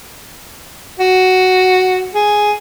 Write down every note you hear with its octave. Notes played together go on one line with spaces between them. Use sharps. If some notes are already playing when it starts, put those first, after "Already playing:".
F#4
G#4